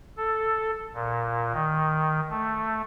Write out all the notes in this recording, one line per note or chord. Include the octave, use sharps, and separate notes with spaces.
A4
A#2
D#3
A3